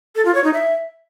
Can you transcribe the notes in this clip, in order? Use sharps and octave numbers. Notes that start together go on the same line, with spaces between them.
A4
F4
C#5
D#4
E5